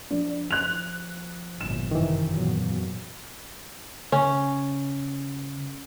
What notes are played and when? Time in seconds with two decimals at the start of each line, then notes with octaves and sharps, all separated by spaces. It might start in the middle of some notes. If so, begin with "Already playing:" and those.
0.11 F3 D4
0.51 F#6 F7
1.61 G1 A#2 E7
1.91 F#2 C3 D#3 E3
2.31 E2 A#2 F#3
4.12 C#3 C#4